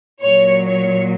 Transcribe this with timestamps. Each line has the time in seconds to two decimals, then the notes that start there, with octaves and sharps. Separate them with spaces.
0.21 A#2 F#3 C#5
0.65 C#5